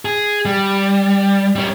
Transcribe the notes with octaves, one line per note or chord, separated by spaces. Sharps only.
G#4
G3
G3 C#4